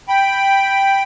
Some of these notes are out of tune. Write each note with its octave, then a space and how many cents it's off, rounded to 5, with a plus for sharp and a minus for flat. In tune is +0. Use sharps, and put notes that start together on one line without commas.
G5 +0 B5 +0